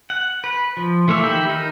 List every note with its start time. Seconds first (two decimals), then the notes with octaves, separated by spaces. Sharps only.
0.10 F#5
0.44 B4
0.77 F3
1.08 E3 A3 A#3 E5
1.22 D#3 G4 E5 B5
1.49 D#4 A#4